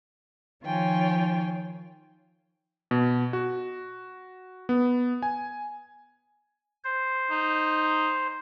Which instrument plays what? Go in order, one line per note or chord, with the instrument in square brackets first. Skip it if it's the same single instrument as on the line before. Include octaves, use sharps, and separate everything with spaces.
[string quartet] D#3 F3 F4 C#5 G5 G#5
[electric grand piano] B2
F#4
B3
G#5
[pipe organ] C5
[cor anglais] D#4